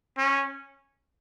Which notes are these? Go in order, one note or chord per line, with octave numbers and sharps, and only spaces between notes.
C#4